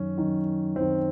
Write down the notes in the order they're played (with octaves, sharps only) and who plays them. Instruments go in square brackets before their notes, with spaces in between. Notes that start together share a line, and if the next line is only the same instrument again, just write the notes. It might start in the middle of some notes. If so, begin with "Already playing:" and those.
Already playing: [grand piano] F#2 D#3 C#4
F#2 D#3
F#2 D#3 C4